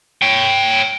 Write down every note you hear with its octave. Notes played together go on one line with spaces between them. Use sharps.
C#5 G5